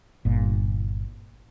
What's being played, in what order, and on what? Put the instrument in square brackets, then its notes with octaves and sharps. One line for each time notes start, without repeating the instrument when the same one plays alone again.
[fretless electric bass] G1 A#2